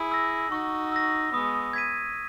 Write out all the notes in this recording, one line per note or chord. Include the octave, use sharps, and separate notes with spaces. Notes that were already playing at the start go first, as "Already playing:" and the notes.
Already playing: E4 G#4
E6 A#6
D#4 F#4 C#6
E6 A#6
G#3 B3 D#6
G#6 B6 D#7